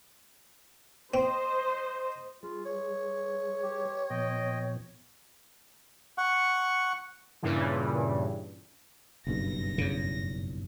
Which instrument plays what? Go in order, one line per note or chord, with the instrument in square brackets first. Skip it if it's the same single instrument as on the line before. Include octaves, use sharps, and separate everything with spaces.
[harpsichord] C4 [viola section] C5 D#5
[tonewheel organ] G3 G#4 [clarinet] F4
[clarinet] C#5
[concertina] G4
[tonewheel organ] A#2 F3 B3 [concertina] D#5 G5
[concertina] F#5 C#6
[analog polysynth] G2 A#2 C#3 E3
[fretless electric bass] F#1 B1 G2 [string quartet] A#6
[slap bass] E2 C#3